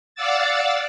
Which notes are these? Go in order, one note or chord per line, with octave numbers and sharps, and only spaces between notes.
D5 F5 F#5 D6 E6 A6